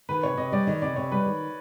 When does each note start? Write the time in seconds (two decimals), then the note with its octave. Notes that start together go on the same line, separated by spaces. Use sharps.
0.09 D#3 B4
0.23 C3 C#5
0.37 C3 D#5
0.52 G3 D5
0.67 D#3 D#5
0.82 C3 D5
0.96 C3 C#5
1.11 G3 B4
1.26 D#3